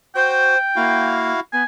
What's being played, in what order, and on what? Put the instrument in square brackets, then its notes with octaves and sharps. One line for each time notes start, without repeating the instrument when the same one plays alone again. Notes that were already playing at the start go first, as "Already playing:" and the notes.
[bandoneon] F#4 [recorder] C5 [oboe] G5
[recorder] A#3 [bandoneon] E4 F#4 F5
[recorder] B3 [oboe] G#5